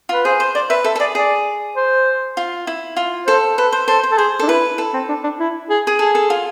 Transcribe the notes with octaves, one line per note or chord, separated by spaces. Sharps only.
F4 B4
G#4 C5
C5
C5 D5
B4 E5
A4 E5
A4
G#4 D5
G#4 D5
C5
F4
E4
F4
A4 C5
A4 B4
C5
A4 C5
C5
A4
G#4 C5
D4 A4
E4 B4
A4
C4
D4
D4
E4
G#4
G#4
G#4 A4
A4
F4